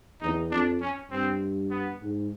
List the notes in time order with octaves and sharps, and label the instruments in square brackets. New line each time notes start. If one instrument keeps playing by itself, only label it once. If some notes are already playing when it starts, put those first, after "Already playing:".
[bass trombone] E2 [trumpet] D#4
[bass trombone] F2 [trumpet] D4
[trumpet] C#4
[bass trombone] G2 [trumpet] C4
[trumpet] B3
[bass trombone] G#2